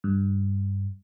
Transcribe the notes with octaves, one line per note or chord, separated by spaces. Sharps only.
G2